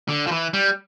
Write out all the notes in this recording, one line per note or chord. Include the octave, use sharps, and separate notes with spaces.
D3
F3
E3
G3